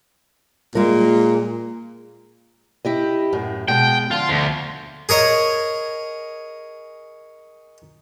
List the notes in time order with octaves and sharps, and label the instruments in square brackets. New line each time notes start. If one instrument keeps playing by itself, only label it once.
[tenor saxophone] A#2 [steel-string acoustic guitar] G#3 A#4
[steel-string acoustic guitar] E4 G4 D#5
F#2 A2
[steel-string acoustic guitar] B2 G#3 [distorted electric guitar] G5
[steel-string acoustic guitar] D3 F3 [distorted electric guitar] F4
[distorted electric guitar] D2
[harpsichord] G#4 A#4 C#5 D#5